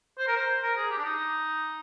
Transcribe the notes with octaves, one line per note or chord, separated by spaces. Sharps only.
C5
A#4
C5
A#4
G#4
G4
D4
D#4